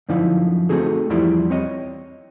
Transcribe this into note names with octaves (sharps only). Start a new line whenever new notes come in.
F#2 D3 F3 D#4 E4 F5
A3 C4 D#4 F#4 G#4 A4
E2 F3 G3 E4 D5 C6
C4 C#5 D#5